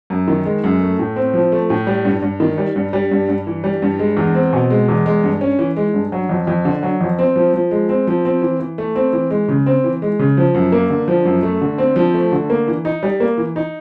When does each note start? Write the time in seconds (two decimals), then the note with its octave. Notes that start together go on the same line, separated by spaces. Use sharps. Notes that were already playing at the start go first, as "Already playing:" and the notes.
0.10 F#2
0.28 D#3
0.45 G#3
0.64 F#2
0.81 A3
0.99 A2
1.16 C4
1.34 F3
1.52 A3
1.70 A2
1.87 G3
2.05 G2
2.22 G2
2.40 D#3
2.58 G3
2.76 G2
2.93 G3
3.11 G2
3.29 G2
3.47 E3
3.64 G3
3.82 G2
3.99 G#3
4.17 E2
4.35 C4
4.53 B2
4.70 G#3
4.89 E2
5.06 G#3
5.24 G2
5.41 C#4
5.59 E3
5.76 G#3
5.94 G2
6.12 F#3
6.29 F2
6.47 F2
6.65 D3
6.83 F#3
7.01 F2
7.19 C4
7.36 F3
7.54 F3
7.71 G#3
7.89 C4
8.07 F3
8.25 C4
8.42 E3
8.60 E3
8.78 A3
8.96 C4
9.13 E3
9.31 G#3
9.48 C#3
9.66 C4
9.84 E3
10.02 G#3
10.19 C#3
10.37 F3
10.54 F#2
10.72 A#3
10.90 D3
11.08 F3
11.25 F#2
11.43 A3
11.61 D3
11.78 C4
11.96 F3
12.14 A3
12.32 D3
12.50 A#3
12.68 E3
12.85 D#4
13.03 G3
13.20 A#3
13.38 E3
13.56 D#4